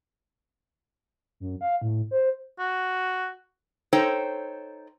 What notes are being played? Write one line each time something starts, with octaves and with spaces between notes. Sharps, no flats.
F#2
F5
A2
C5
F#4
D#4 A4 C5 C#5 G5